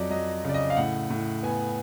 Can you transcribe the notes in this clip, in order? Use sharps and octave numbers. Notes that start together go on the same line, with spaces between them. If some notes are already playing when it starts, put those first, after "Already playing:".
Already playing: F2 F#3 D5 D#5
F#3 D#5
C#3 D5
D#5
F5
A2 F#5
A2
B3 G#5